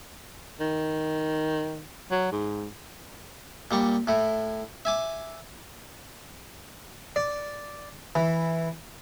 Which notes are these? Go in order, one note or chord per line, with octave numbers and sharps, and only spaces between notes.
D#3
F#3
G#2
A#2 G3 C#6
A2 E4
E5 G#5 D6
D5
E3